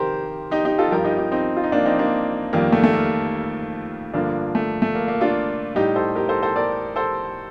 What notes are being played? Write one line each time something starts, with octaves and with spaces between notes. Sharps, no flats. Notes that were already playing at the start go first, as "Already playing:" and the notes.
Already playing: C3 D#3 G4 A#4 C5
D#4 G4
D#4 G4
F4 A4
G2 F3 G4 A#4
D#4 G4
D#4 G4
C4 D#4
F4
D#4
A#3 D4
C4 D#4
A#3 D4
F2 D#3 G3 A#3
A3
A3
A#3
G2 D3 F3 A#3 D4
A3
A3
A#3
A#3
D4 F4
A2 G3 D#4 G4
A4 C5
G4 A#4
A4 C5
A4 C5
A#4 D5
A4 C5